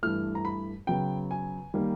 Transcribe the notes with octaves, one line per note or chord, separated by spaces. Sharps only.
G2 E3 A3 F6
A#5
B5
C#3 F#3 B3 G5
G#5
D#3 G3 A#3